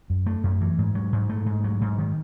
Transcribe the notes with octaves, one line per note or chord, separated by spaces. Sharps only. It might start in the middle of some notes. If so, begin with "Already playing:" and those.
F#2
A3
F#2
E3
G#2
F#3
G#2
A3
G#2
F#3
G#2
D#3